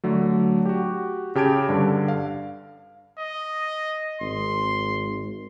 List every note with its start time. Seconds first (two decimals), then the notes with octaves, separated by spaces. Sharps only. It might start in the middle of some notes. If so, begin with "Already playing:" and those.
0.04 D3 F#3 A3
0.65 F#4 G4
1.35 C#3 G4 A5 G#6 D7
1.69 G2 D3
2.08 F5
3.19 D#5
4.21 G#1 C6